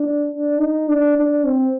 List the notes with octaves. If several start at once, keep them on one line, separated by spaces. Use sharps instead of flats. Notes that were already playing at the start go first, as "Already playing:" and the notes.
Already playing: D4
D4
D#4
D4
D4
C4